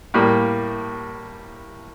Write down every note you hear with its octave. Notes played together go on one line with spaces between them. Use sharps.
A2 G3 A#3